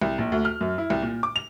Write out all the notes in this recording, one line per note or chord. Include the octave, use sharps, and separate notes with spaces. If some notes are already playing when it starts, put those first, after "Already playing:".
C2
A#1
D2
F6
F#2
E4
C2
A#2
D6
F7